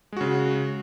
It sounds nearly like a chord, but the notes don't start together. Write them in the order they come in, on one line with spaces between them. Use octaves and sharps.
G#3 F#4 C#3